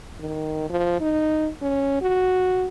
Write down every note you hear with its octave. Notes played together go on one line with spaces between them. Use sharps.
D#3
F3
D#4
C#4
F#4